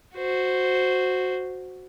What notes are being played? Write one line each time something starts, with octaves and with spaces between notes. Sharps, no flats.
F#4 C5